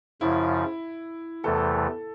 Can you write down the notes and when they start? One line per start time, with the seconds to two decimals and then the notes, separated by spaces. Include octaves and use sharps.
0.21 F#2 C#3 F3 E4
1.44 E2 C3 E3 A3 A4
1.75 A4